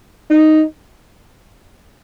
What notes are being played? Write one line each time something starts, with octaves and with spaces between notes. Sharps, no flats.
D#4